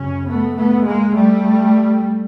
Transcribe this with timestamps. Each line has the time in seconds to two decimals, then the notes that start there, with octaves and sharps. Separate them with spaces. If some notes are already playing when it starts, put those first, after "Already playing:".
Already playing: F#2 C#3 C#4
0.29 A3 B3
0.57 A3 B3
0.86 G#3 A#3
1.15 G3 A3